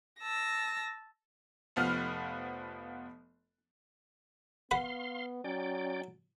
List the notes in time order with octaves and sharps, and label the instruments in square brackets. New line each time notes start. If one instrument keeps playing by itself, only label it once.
[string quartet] A5 E6 A#6
[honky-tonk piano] F1 F3 B3 F6
[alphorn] B3 [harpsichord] B4 F#5 B5 [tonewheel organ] F5 C6
[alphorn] F#3 [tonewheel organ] C#4 D5 G5